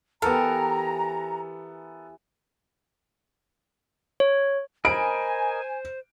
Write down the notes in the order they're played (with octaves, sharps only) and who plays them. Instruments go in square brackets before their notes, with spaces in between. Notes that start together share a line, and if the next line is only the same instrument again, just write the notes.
[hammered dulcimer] E3 G4 [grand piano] B3 A4 [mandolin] A#4 [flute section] A#5
[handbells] C#5
[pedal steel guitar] A#4 D#5 B5 [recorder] C5 [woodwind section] G#5 [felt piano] D7